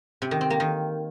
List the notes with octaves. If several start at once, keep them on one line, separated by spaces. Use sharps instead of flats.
C3
D#3
C4
A#3
D#3